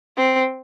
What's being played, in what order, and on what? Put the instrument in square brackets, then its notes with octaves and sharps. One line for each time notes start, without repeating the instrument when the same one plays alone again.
[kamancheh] C4